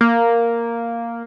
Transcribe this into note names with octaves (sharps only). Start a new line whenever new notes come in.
A#3